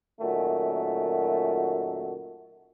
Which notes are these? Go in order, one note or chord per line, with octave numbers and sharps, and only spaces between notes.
F#2 A#2 D#3 A3 F#4